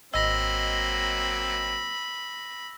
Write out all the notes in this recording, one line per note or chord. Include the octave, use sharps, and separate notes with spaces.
G#1 F#3 A#3 C4 D#5 B5 E6 A#6